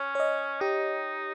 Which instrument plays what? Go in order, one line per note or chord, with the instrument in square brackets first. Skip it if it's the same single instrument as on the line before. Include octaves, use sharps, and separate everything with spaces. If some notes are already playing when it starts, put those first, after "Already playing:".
Already playing: [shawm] C#4 [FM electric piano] C#5
[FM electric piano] C#5
D#5
[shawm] D#4 [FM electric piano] G4